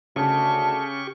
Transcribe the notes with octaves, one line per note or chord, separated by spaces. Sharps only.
D2 C#3 G4 A5 C#6